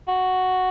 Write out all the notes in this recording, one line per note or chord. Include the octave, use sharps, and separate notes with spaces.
F#4